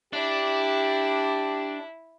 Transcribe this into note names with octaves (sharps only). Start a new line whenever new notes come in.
D4 E4 G4